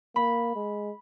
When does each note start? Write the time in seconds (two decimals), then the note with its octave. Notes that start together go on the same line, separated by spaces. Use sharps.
0.16 A#3 B5
0.55 G#3